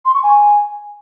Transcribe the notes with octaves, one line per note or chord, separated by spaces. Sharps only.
C6
C#6
G#5